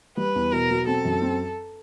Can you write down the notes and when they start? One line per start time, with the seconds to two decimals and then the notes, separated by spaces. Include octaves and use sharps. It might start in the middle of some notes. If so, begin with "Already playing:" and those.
0.17 G3 B4
0.36 E2
0.52 B2 A#4
0.70 F#3
0.87 C4 A4
1.05 F#2
1.22 C4